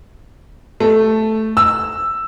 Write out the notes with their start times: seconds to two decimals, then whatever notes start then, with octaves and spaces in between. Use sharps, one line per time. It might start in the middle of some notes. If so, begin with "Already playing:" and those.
0.80 A3
1.57 E6